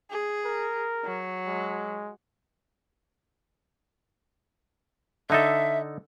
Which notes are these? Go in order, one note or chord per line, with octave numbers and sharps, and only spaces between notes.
G#4
A#4
F#3
G#3
D3 D#4 A4 E5